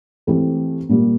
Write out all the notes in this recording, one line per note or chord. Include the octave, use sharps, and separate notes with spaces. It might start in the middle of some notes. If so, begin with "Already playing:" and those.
E3 A3 C4 G4
A#2 G3 A#3